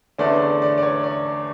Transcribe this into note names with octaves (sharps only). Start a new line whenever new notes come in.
E2 D3 A3 C#4 D5
D5
D5
D5
C#5
D5